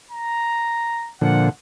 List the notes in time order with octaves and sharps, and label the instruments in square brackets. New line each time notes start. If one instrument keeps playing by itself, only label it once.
[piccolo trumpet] A#5
[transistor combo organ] A#2 D3 F3 [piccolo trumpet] F#5